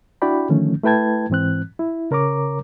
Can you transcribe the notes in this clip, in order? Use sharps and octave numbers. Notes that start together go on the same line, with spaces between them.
D4 E4 F#4 D5 G5 B5
D3 D#3 F3 A3 C#4
A3 E4 B4 G5 A5 G#6
G#2 E3 C4 F#6
E4
C#3 A#4 C#5 A#5 D6